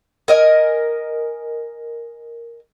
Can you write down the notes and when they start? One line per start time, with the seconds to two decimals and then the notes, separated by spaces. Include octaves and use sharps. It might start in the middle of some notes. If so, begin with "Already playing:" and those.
0.28 A#4 D#5 G#5